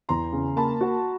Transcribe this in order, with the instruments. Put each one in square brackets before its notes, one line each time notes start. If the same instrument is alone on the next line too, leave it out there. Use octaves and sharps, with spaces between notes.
[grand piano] E2 [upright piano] A#5 C6
[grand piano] C#3
[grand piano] A#3 [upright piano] A5 B5
[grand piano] F#4